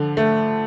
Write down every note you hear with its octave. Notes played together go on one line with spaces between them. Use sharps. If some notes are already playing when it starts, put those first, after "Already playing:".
Already playing: D3 F3
A3